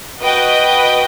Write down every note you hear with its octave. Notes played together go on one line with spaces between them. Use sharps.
F#4 B4 D#5 G5